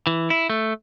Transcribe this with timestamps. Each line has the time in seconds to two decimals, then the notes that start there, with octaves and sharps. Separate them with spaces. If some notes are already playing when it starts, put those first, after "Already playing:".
0.07 E3
0.30 E4
0.50 A3